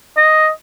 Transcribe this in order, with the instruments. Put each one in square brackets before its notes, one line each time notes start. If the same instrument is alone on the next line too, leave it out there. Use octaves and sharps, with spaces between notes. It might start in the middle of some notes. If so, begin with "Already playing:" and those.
[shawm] D#5